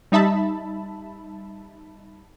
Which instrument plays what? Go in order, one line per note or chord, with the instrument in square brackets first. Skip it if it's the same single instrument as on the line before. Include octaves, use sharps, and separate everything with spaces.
[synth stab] G3 D#4 E5 A5 B5